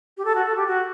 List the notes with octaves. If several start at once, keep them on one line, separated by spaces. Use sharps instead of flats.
G4
A4
F#4
A4
G4
F#4